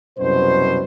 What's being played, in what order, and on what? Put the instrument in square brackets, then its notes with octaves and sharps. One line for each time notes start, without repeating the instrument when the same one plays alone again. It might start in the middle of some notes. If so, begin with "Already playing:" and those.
[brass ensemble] C2 F#2 B2 C5